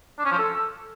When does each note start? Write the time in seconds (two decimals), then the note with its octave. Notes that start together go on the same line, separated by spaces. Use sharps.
0.19 D4
0.25 C#4
0.32 F3
0.38 A4